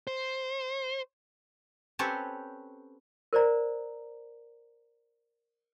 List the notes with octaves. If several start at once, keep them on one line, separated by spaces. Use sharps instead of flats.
C5
C4 C#4 G4 A4 B4 C#5
A#4 C5 D5 A#5